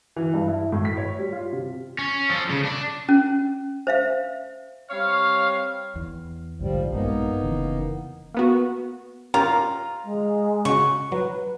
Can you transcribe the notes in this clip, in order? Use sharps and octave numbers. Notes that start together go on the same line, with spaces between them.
E3
G2
E4
A2
B6
C#5
G3
F4
C3
C#4
F3 A4
C#3
D4
C#4
C5 E5 F5
G3 C4 C#5 F5
E2
A#1 G#2 D3 F3 G3
A#1 G2 G#3 A#3 B3 D#4
F1 C#3 E3
A#3 B3 F#4
C#4 F4 G4 A#4 A#5
G#3
C#3 F#4 C#6
F#3 B4